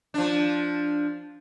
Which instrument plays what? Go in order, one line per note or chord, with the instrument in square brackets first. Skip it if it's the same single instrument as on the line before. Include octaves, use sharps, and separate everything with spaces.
[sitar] F3 D4